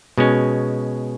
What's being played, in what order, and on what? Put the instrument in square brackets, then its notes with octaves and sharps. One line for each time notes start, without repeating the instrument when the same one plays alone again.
[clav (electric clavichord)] B2 G#3 C#4